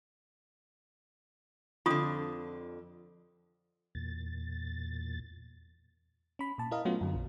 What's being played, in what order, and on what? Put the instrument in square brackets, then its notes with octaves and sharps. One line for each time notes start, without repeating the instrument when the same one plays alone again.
[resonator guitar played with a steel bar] F2 D3 [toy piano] F4 D#6
[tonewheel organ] E2 A#2 A6
[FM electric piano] C#4 B5
A#2 A5
E4 A#4 D#5 F5
F#3 A3 B3 C#4 F4 F#4
F#2 D3
A#1